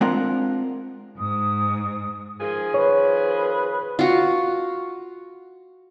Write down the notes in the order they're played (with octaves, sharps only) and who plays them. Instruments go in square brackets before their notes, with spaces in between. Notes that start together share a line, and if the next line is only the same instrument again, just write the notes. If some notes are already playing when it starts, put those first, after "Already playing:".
[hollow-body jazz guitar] G#3 C4 D4 F4 A#4 F#5
[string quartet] G#2 [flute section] D#6
[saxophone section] D#3 F3 G#4
[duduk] B4 [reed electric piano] C#5
[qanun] F4 F#4